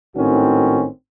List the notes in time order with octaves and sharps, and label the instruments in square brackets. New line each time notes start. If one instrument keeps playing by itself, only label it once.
[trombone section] G#1 A2 D#3 C4 C#4 F#4